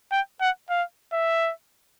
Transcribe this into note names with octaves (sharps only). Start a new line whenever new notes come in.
G5
F#5
F5
E5